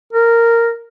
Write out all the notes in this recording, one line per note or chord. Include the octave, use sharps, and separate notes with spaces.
A#4